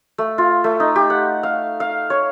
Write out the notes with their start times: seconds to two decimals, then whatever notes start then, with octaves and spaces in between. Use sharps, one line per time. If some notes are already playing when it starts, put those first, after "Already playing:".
0.18 A3
0.38 F4
0.64 A3
0.80 D#4
0.96 G4
1.10 F#5
1.43 F5
1.80 F5
2.10 C#5